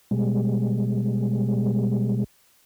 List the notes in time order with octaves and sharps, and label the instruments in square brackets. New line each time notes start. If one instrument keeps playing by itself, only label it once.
[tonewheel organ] B2 G3 G#3